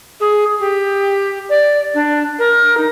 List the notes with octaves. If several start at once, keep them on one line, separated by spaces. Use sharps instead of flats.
G#4
G4
D5
D4
A#4
D#4